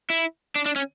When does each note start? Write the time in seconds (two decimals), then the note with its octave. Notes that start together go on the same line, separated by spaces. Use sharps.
0.10 E4
0.55 D4
0.66 D4
0.76 C#4